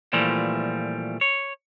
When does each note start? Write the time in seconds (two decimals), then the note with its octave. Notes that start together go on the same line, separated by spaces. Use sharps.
0.13 A#2 E3 F3 G3 A3
1.21 C#5